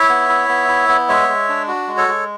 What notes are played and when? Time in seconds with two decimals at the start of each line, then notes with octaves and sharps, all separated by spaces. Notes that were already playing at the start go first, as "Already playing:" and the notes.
Already playing: E4 C#5 E5
0.09 B3
0.29 E4
0.49 B3
0.68 E4
0.89 B3
1.09 G#3 C#5 E5
1.28 G#3
1.49 D4
1.68 F#4
1.88 G#3
1.97 A4 C#5
2.08 G#3